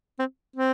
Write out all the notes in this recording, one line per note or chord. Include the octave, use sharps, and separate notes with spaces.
C4
C4